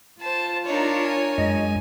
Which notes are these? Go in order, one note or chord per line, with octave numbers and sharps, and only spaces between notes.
F4 C5 A5
D4 D#4 A#4 C#5
G#5
F#2 G#3 D#5